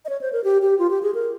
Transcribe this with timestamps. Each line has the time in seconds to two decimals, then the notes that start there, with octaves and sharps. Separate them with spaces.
0.05 D#5
0.09 C#5
0.21 C5
0.33 A#4
0.44 G4
0.62 G4
0.79 F4
0.90 G4
1.03 G#4
1.14 A#4